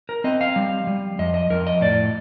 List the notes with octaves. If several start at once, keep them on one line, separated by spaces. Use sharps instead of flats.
A#4
C4 D#5
F5
G3
G3
F2 D#5
D#5
F2 A#4
D#5
A2 D5